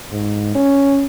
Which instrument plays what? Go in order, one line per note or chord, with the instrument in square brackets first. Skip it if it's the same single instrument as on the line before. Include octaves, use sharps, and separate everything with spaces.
[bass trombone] G#2
C#4